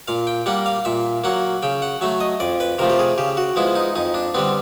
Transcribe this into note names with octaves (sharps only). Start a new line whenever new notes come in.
A#2 F5
G5
G3 A#3 F#5
F5
A#2 E5
F#3 A#3 F#5
C#3 G5
F#5
F#3 A3 E5
D#5
F2 D5
B4
C3 F3 A3 A#4
G4
G#4
C#3 G4
F#4
F3 G#3 B3 E4
D#4
F2 D#4
D4
D3 G3 B3 C4